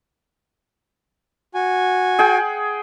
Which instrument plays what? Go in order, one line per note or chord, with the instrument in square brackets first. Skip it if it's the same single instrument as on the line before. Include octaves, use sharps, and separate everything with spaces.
[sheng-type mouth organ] F#4 G#5
[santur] G#4 F#5 G5